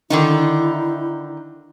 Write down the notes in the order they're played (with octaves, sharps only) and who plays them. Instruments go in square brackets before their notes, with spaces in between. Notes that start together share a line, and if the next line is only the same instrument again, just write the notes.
[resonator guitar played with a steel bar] D3 D#3 D#4 [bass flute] E4